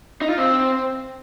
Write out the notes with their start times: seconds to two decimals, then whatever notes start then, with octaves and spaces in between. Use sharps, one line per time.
0.21 D#4
0.30 F4
0.38 C4